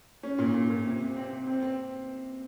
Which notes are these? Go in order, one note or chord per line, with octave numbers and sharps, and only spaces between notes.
C#4
A#2
A#2
A#2
C3
C3
C4
C3
C4
C4